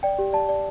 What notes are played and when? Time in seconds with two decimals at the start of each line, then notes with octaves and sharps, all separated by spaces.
0.03 D5 G5
0.19 G4
0.33 D5 A5
0.49 D5